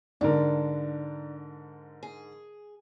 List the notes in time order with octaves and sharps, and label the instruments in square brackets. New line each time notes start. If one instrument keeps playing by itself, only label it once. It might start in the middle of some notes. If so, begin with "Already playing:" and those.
[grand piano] G#2 D3 A#4 [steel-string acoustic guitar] D4
[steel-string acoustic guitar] G#4